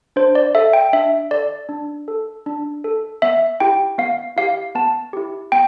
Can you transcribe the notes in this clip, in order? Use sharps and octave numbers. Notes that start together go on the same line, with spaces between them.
D4 C5
D5
A4 E5
G5
D4 E5
A4 D5
D4
A4
D4
A4
B3 E5
E4 G4 G5
B3 F5
E4 G4 F5
B3 A5
E4 G4
B3 G5